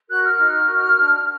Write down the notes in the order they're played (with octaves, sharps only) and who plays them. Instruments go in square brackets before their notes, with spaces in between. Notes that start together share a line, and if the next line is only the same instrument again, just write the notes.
[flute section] F#4 A#4 F#6
F6
D#4 F6
F#4 A#4
D4